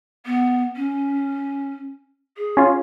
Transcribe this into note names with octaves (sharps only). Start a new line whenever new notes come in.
B3
C#4
G#4
C#4 F4